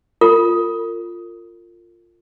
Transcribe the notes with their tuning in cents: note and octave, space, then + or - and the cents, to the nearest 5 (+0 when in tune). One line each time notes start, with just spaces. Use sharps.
F4 -5 A#4 -40